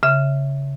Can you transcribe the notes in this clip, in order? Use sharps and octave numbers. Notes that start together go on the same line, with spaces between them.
C#3 E5